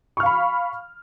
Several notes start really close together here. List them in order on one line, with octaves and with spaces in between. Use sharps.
C#6 F6 F5 B5